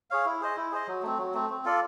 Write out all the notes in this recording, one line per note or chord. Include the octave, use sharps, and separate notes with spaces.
G#4 C#5 F5
E4
G#4 C5 D#5
E4
G#4 C5 D#5
F#3
A3 C4
F#3
A3 C4
C4
F4 A4 D5